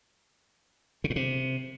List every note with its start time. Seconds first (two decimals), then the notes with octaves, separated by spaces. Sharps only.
1.04 C#3
1.10 A2
1.16 C3